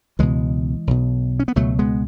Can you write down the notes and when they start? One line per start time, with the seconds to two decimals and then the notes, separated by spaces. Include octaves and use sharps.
0.19 C#2 B2 E3 G#3
0.87 B1 B2
1.39 C#4
1.48 B3
1.56 C#2 B2 F#3 A3
1.79 G#3 B3